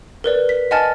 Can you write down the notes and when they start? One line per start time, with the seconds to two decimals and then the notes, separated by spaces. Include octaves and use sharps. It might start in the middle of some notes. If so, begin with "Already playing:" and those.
0.24 A#4 B4 D5
0.49 B6
0.71 D#5 F#5 G#5 A5 F6 A6